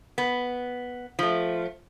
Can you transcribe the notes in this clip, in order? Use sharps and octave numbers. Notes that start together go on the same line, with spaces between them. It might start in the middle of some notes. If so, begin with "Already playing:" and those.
B3
F3 A3